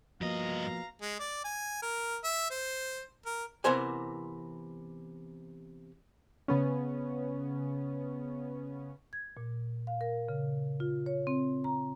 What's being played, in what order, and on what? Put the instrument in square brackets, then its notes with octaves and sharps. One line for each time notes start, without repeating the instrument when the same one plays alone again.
[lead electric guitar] G2 D#5 [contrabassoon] B2 [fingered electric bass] F3 A#3 [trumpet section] F5 A#5
[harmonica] G#3
D5
G#5
A#4
E5
C5
A#4
[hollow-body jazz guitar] C3 E3 B3 A#4 C5 G#5
[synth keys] C#3 B3 C#4
[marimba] G#6
A#2
F5
A#4
C#3
F4
C#5
C4
A#5